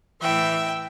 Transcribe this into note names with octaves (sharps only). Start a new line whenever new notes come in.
A2 E3 E5 G5